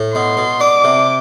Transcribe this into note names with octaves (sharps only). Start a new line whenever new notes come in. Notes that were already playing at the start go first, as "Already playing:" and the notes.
Already playing: A2
B2 C6
B2
D4 D6
C3